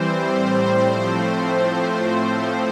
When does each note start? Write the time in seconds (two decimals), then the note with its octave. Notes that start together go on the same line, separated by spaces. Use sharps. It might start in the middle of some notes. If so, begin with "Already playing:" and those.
Already playing: E3 G3 C4 C5
0.27 A2 G3 C4
0.84 A2 F3 A3 C4